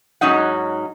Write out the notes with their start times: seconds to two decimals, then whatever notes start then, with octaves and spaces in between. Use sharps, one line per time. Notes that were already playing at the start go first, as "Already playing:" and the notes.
0.21 G#2 F#3 C#4 D#4 F#5